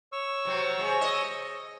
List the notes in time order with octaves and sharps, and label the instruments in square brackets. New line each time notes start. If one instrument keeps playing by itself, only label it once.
[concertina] C#5 C#6 E6
[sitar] C3 F#3 C4
C3 G#3
D#5